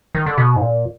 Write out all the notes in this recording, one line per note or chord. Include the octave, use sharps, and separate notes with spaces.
D#3
D3
B2
G#2
A#2